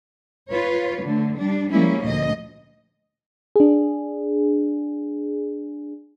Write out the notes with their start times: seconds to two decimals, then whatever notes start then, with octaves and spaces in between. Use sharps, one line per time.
0.50 F4 B4 C#5
1.04 D3 A3
1.39 G3 D4
1.71 F3 G3 G#3 A#3 C#4 E4
2.02 D2 A#2 F3 D#5
3.56 D4 G#4